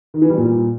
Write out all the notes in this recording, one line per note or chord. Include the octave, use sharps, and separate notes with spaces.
D#3
E3
G3
A#2